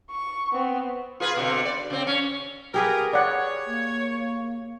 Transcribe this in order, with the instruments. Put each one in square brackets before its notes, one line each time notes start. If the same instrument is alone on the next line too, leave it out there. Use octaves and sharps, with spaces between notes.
[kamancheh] C#6
B3 C4
[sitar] F4 G#4 B4
B2 D3 C4
D5
C#3 C4
C#4
[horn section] A#3 B3 A#4 [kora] G4 G#4 B4
[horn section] C#5 [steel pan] D5 F#5
[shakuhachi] A#3